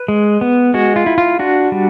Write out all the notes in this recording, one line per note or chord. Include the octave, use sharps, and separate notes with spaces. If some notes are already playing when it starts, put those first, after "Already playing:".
Already playing: B4
G#3
B3
G#3 F#4
F4
E4
F4
D4 F#4
G3